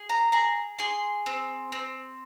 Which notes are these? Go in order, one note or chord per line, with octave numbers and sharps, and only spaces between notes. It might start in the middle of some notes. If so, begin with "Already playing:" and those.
Already playing: G#4
A#5
G#4 A#5
G#4 C6
C4
C4